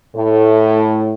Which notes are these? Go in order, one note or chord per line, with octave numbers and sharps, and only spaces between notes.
A2